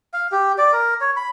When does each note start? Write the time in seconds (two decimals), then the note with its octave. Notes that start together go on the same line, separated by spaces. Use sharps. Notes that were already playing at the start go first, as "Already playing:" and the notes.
0.14 F5
0.32 G4
0.58 D5
0.73 A#4
1.01 C#5
1.16 B5